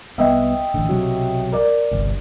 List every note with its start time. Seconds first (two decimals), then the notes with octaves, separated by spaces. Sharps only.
0.18 C2 B3 D#5 E5 G5
0.74 A1 D3
0.89 B1 C3 F#3
1.52 A#4 D5
1.91 G1 C2